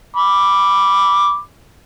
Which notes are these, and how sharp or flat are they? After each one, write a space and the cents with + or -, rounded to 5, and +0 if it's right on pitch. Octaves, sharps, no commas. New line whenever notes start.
B5 -5 D6 +0